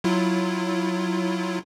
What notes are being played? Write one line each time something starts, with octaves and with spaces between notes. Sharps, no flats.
F#3 E4 F4